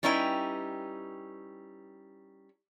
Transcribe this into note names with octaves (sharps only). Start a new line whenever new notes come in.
G3 C#4 D#4 E4 B4 G5